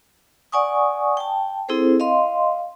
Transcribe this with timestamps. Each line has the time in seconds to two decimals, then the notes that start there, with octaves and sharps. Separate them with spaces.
0.52 D5 F#5 G#5 C#6 D#6
1.17 G5 A5
1.69 C4 E4 G#4 A4 C5
2.00 D#5 F5 C6